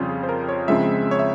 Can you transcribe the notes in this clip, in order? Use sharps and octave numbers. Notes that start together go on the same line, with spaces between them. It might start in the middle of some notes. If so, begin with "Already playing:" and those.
Already playing: F2 C#3 G3 C4 C#4 F4
G#4
C5
A#4
C#5
C#2 C#3 F3 G#3 C4 E5
C#5
E5